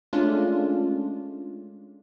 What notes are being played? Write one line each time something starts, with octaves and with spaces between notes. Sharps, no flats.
G#3 A3 C#4 D4 F4